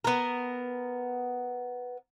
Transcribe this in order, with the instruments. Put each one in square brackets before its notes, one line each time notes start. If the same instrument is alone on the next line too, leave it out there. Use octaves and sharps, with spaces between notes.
[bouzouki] B3 A#4